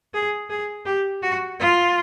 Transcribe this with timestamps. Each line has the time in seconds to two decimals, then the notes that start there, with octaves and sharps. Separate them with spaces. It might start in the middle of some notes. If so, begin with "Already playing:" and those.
0.14 G#4
0.50 G#4
0.86 G4
1.22 F#4
1.60 F4